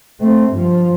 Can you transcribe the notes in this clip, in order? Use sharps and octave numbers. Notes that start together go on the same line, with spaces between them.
A3 C4
G2 F3